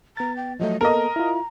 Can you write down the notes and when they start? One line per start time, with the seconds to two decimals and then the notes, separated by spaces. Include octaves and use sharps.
0.17 B3 A#5 A6
0.36 G5
0.60 F3 F#3 A3 D#5
0.81 A#3 B3 A4 A#4 D#5 A#5
1.16 E4 F4